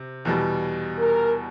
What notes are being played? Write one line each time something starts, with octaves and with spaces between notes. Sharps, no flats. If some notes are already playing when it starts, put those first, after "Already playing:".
Already playing: C3
E2 B2 G3
A#4